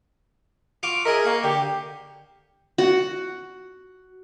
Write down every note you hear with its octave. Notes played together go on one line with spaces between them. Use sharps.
F4 F#4 D6
G#4 A#4 D#5 E5
A#3 F#4
D3 G4
F#4